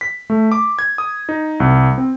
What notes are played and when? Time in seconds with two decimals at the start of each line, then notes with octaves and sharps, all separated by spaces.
0.01 B6
0.30 A3
0.52 D6
0.79 G#6
0.98 D#6
1.29 D#4
1.60 C2
1.98 C4